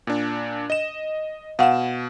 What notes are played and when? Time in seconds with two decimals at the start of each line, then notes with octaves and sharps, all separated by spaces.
0.07 A#2 D4
0.70 D#5 E7
1.59 B2 F5 F#5 E7